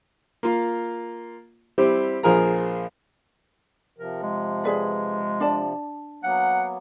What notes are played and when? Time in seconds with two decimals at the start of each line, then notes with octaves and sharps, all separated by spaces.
0.43 A#3 F4
1.78 G3 C4 E4 G4
2.23 A#1 F3 F4 G#4 A#4 A#5
3.98 C3 F3 A#4
4.23 G#3
4.64 G#4 B4 D5
5.40 D4 D5 A5
6.23 F#3 A#3 B3 F#5